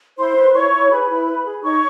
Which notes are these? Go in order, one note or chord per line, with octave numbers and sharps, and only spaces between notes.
E4 C5 C6
B4
E4 C#5 C#6
E4
G#4 B4 B5
E4
B4
G#4
D#4 C#5 C#6